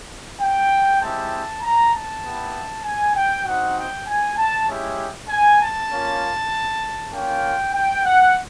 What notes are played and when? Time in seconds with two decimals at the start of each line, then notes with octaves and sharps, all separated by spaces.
0.40 G5
1.01 G#3 C4 E4 G4 A5
1.63 A#5
1.93 A5
2.24 B3 E4 G4
2.85 G#5
3.15 G5
3.46 C4 D#4 F#4 F#5
3.76 G5
4.07 G#5
4.37 A5
4.68 G#3 C#4 E4 G4
5.29 G#5
5.60 A5
5.90 A#3 C#4 F4
7.13 A#3 C#4 F4 G5
7.74 G5
8.04 F#5